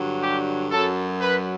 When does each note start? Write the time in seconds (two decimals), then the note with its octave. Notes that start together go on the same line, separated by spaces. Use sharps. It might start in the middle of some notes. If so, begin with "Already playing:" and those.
Already playing: G2 D3 F#3
0.21 G4
0.71 F#2 F#3 A4
1.20 B4